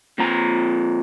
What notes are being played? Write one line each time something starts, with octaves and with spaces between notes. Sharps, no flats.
A#2 F3 C4 A#5